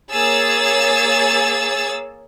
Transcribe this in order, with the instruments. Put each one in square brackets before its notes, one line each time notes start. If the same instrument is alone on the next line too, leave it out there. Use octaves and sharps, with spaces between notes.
[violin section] A#3 G#4 C#5 E6 A6